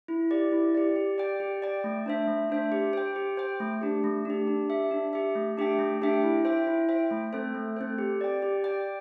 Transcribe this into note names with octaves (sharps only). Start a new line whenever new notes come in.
E4
G4 D5
E4
G4 D5
G4
D5 G5
G4
D5 G5
A3
D4 C5 E5
A3
D4 C5 E5
G4
C5 G5
G4
C5 G5
A3
D4 G4
A3
D4 G4
D4
G4 E5
D4
G4 E5
A3
D4 G4 E5 G5
A3
D4 G4 E5 G5
E4
C5 E5 G5
E4
C5 E5 G5
A3
C4 A4 C5
A3
C4 A4 C5
G4
D5 G5
G4
D5 G5